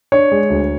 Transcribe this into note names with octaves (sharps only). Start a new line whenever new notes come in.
D4 C#5
G#3
D2